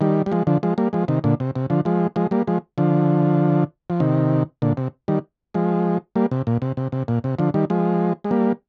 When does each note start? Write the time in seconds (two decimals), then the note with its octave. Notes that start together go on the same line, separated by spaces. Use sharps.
0.01 D#3 G3
0.26 G3
0.32 F3 G#3
0.47 D3 F3
0.63 F3 G#3
0.78 G3 A#3
0.93 F3 G#3
1.08 C3 D#3
1.24 A#2 D3
1.40 C3
1.56 C3
1.70 D3 F3
1.85 F3 G#3
2.16 F3 G#3
2.31 G3 A#3
2.47 F3 G#3
2.78 D3 F3
3.90 F3
4.00 C3 D#3
4.62 A#2 D3
4.77 C3
5.08 D#3 G3
5.54 F3 G#3
6.16 G3 A#3
6.31 C3
6.47 A#2
6.62 C3
6.77 C3
6.92 C3
7.08 A#2
7.24 C3
7.39 D3 F3
7.54 D#3 G3
7.70 F3 G#3
8.24 G#3
8.31 G3 A#3